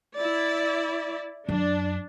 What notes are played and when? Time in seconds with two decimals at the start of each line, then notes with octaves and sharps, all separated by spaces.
0.16 E4 D5
1.49 F#2 D4